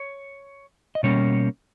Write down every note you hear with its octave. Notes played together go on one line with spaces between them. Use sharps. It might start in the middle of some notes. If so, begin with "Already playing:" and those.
Already playing: C#5
D#5
B2 G3 A#3 C#4 C#5